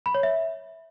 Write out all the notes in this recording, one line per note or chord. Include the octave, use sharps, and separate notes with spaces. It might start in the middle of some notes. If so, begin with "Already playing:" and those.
B5
C#5
E5